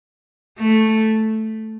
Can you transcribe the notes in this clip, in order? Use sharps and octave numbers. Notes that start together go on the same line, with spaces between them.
A3